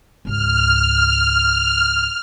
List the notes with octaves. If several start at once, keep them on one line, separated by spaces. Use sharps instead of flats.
C#2 G#2 F6